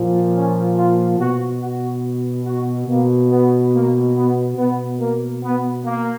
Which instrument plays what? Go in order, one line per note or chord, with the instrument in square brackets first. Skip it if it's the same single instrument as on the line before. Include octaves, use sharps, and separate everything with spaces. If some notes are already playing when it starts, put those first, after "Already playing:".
Already playing: [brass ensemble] A#2 F3
C#4
F4
B2 F#4
F#4
F#4
B2 A#3
B3
A#3
B3
B2 B3
A#3
B3
A#3